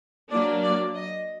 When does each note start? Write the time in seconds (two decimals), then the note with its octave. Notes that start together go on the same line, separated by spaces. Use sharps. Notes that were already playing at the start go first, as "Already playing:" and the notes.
0.30 F#3 A#3 D4 D5
0.62 D5
0.95 D#5